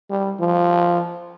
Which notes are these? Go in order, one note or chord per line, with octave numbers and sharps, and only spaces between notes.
G3
F3